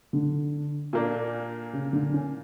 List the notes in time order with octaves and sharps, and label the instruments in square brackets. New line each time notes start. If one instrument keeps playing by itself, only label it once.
[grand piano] D3
[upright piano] A#2 A#3 D4
[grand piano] C#3
D3
C#4